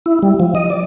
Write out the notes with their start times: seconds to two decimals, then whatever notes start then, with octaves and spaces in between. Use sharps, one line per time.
0.06 E4
0.23 G3
0.40 F3
0.55 D#5
0.70 D5